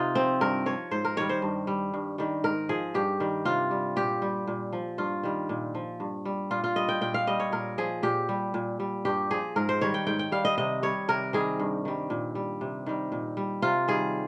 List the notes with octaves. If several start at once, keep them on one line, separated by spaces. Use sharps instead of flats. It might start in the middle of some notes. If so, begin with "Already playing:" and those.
Already playing: C3 D#4 F4
F3 C4
G2 A#4
F3 C#5
G#2 C5
A#4
D#3 G3 C#5
C5
G2
G3
G2
D#3 G3
G#2 A#4
F3 G#4
G2 G4
D#3 G3
C3 F4
G3
A#2 G4
G3
A#2
F3
G2 F4
D#3 G3
A#2
F3
G2
G3
A#2 F4
F4
G3 D#5
G5
A#2 G5
F5
G3 D#5
C#5
A#2 A#4
F3 G#4
A#2 G4
G3
A#2
G3
G2 G4
F3 G#4
G#2 A#4
C5
D#3 G3 C#5
G5
G#2 G5
G5
G3 F5
D#5
C3 D#5
G3 C#5
C3 A#4
D#3 G3 G#4
G2
D#3 G3
A#2
G3
C3
D#3 G3
A#2
G3
C3 F4
D#3 G3 G#4